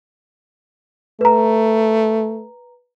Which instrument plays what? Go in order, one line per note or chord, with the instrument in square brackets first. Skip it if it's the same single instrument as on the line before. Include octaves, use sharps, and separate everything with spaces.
[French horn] A3 [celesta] B4 A#5